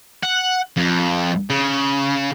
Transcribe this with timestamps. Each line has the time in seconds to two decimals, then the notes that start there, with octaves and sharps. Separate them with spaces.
0.23 F#5
0.77 F2
1.49 C#3